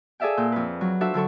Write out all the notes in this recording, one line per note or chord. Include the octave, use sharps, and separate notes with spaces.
G#4 A4 D5 E5 F5 G5
A#2 G6
F2 B4
F#3
D4 F4 F#4 A4 C5 E5
D3 F#3 A4 C#6